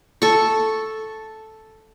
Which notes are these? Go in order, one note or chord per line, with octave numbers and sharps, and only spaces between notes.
A4 C#6